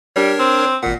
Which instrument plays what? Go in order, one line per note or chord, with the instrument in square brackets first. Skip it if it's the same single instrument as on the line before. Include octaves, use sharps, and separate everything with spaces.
[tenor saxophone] G3 [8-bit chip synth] D4 A#4 C#5
[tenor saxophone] C4
[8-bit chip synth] G#1 F#5 [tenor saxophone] A#2